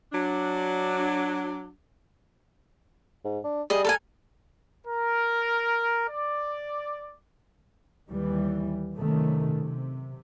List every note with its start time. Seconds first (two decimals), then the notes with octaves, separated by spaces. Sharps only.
0.13 F#3 D4
3.25 G#2
3.44 D4
3.70 G3 G#4 D#5
3.85 A4 A#4 G#5
4.86 A#4
6.08 D5
8.09 D#2 E3 G3
8.95 F#2 C3 D#3 A3
9.55 C3